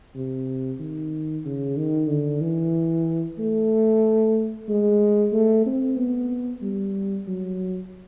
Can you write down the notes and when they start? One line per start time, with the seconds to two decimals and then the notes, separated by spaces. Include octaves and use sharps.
0.15 C3
0.80 D#3
1.45 C#3
1.77 D#3
2.09 D3
2.41 E3
3.39 A3
4.69 G#3
5.33 A3
5.66 C4
5.98 B3
6.62 G3
7.27 F#3